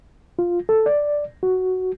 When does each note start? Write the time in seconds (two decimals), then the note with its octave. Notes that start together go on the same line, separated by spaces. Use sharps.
0.39 F4
0.69 A4
0.86 D5
1.43 F#4